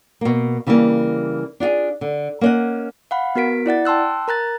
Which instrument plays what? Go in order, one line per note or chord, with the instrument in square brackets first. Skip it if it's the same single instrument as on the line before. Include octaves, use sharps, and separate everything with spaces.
[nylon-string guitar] B2 A#3
C#3 E3 G3 A3 A#3
D4 F4 F#4 G#4
D3
A#3 C#4 C#5 D#5 F#5
[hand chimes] F5 F#5 B5
B3 F#4 A#4 B6 D7
E4 D5 F#5 A6
G5 A5 C6 E6 F#6
A#4 A#5 F#6 A6